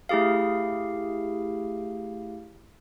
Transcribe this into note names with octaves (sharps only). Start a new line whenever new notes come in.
A3 E4 G4 G#4 F5